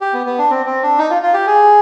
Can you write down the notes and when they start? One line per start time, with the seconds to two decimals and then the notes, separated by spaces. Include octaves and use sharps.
0.01 G4
0.13 B3
0.26 B3
0.38 D4
0.51 C4
0.66 C4
0.83 D4
0.98 D#4
1.10 F4
1.23 F4
1.34 G4
1.47 G#4